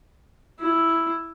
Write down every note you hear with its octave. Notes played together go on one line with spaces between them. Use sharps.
E4